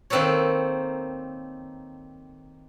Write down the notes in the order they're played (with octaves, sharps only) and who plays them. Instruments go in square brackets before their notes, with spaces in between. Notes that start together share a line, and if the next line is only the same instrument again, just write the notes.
[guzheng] D#3 A#3 C4 A4 B4 C#5